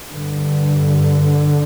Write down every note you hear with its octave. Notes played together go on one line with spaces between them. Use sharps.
G2 D3